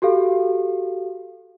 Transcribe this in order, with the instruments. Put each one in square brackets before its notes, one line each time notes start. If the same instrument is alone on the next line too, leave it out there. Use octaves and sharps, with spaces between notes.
[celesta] F#4 G4 A4 F5